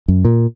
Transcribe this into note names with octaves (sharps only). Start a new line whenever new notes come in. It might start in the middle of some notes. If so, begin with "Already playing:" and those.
F#2
A#2